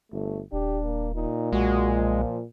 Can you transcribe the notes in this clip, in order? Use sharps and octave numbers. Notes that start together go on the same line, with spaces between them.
G1 A3
D#1 D4 G4
A#3
A#2 D#4
B1 G#3 F#4
F3